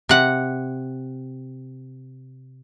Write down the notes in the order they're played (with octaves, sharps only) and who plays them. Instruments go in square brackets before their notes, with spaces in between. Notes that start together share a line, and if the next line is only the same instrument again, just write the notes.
[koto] C3 F#5